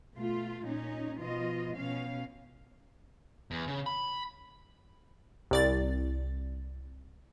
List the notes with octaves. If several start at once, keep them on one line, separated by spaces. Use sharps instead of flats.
B2 A3 F4
A#2 C#4 D#4
B2 F3 F4 D#5
B2 C#4 F5
E2
C#3
B5
C2 D5 A6